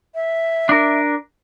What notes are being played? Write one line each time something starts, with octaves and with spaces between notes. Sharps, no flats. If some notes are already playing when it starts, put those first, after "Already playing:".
E5
D4 A#4